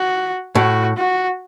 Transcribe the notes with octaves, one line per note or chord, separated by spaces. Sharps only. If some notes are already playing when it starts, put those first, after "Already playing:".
Already playing: F#4
A2 F#4
F#4